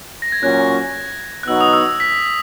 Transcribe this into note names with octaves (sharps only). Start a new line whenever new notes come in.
A#6
G#6
A#2 F#3 C#4 F#6
F#6
B2 F#3 B3 D#4 F#4 E6
D#6
E6
E6
B6